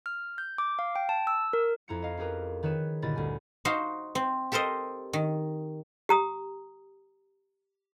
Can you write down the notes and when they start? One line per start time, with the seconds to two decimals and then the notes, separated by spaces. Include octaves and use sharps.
0.06 F6
0.38 G6
0.58 D6
0.79 F5
0.96 G5
1.09 A5
1.27 E6
1.53 A#4
1.88 F2 E4 A#5 G#6 C#7
2.02 D#5 F5
2.17 C#4 G4 G#4 A#4 B4
2.63 D#3 G#4 B4 C#5 E7
3.02 G1 A#2 E4 D#5 B5 A6
3.15 D2 G3 G#5
3.65 D#4 F#4 C5 F5
4.15 C4
4.52 G4 A4 A#4 C5 D#5
5.13 D#3
6.09 G4 A#5 D#6